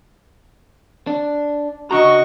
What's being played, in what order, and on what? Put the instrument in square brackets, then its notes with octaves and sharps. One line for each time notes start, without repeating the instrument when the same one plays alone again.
[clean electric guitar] D4
[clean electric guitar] C#3 D4 A#5 [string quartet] F#4 D#5 C#6